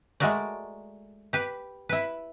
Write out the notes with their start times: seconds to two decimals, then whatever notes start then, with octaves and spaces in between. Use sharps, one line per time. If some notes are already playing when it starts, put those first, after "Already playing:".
0.20 G#3 A3 F#4 A#4 D5
1.33 G4 B4
1.89 E4 B4